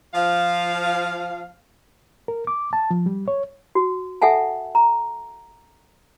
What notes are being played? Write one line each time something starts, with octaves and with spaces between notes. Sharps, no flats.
F3 F5
A#4
D6
A5
F3
G3
C#5
F#4
A4 E5 F#5 G#5 A5
A#5